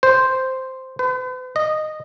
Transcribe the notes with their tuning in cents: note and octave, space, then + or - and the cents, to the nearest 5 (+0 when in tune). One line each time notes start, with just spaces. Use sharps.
C5 -5
B4 +45
D#5 -10